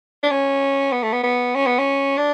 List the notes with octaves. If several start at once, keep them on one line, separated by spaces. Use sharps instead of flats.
D4
C#4
B3
A3
B3
B3
C#4
B3
C#4
D4